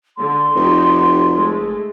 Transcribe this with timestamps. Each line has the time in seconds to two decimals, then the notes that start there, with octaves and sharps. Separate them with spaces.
0.17 D3 C6
0.56 F1 D#4 F#4 G4
1.34 G#3 A3